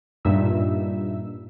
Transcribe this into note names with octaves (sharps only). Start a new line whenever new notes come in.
G2 A#2 D#4 E5 E6